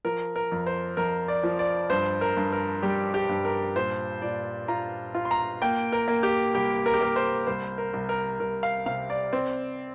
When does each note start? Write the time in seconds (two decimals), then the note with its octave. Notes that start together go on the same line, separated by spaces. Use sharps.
0.05 F3 A#4
0.36 A#4
0.52 F2
0.66 C5
0.97 F2 A#4
1.28 D5
1.44 F3
1.59 D5
1.90 G2 C5
2.21 A#4
2.37 G2
2.53 A#4
2.83 G3 G4
3.14 G4
3.29 G2
3.45 A#4
3.76 A#2 C5
4.22 A#2 D5
4.68 F4 A#5
5.15 F4
5.25 C6
5.31 A#5
5.62 A#3 G5
5.92 A#4
6.08 A#3
6.23 G4
6.54 C2 G4
6.86 A#4
6.94 G4
7.01 A#3 A#4
7.16 C5
7.47 C2 C5
7.78 A#4
7.93 C2
8.09 A#4
8.40 C2 A#4
8.63 F5
8.86 C3 F5
9.10 D5
9.33 C4